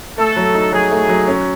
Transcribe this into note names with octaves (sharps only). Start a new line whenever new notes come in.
A3 A4
F#3
D#4
F#3 G#4
A3
F#3
C#4